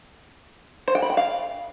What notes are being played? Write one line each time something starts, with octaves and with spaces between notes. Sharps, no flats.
C5
G5
B5
G5
F5